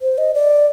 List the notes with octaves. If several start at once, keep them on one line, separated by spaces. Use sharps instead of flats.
C5
D#5
D5